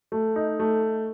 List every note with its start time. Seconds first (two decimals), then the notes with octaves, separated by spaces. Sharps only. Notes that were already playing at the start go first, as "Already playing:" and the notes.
0.12 A3
0.36 D#4
0.59 A3